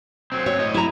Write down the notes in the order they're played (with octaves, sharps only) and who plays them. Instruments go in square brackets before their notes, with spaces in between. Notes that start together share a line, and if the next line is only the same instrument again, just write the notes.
[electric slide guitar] F#3 C4
[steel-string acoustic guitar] C#5
[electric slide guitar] A2 D#5
[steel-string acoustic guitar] E4 A#5